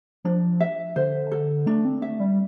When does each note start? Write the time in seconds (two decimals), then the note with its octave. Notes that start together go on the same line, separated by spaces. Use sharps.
0.24 F3 D4
0.60 E5
0.96 D3 C5
1.32 A4
1.66 A3 D4
1.85 C4
2.02 A3 E5
2.20 G3